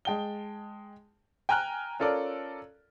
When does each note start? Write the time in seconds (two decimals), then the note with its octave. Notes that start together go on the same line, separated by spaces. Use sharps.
0.05 G#3 G5 A5 G7
1.49 G5 G#5 A#5 F6 F#6
2.00 C#4 F4 A4 A#4 D5